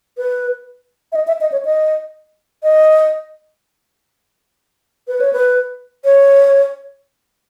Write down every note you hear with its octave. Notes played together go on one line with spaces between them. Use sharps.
B4
E5
D#5
E5
D#5
C#5
D#5
D#5
B4
C#5
B4
C#5